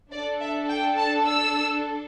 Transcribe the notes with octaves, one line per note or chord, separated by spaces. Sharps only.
D4 A4 D5
E5
G5
A5
E6